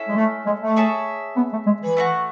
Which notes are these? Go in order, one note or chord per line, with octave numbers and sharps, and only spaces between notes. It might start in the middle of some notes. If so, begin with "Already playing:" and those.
Already playing: C#4 E4 A4 E5
G#3
A3
G#3
A3
G#4 C#5 E5 A5
B3
A3
G#3
E3
A3 D#4 F#4